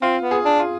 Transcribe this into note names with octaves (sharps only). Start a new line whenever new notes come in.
C4 F4
B3
G#4
D4
F4